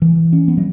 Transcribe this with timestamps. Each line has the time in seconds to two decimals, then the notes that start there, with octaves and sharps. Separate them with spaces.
0.02 E3
0.33 C#4
0.48 B3
0.57 F#3